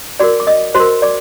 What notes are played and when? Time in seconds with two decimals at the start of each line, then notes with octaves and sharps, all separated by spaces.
0.20 F#4 A#4 D5 D6
0.40 D6
0.47 D#5 D#6
0.74 F#4 C5 C6
0.80 A#4
1.02 D5 D6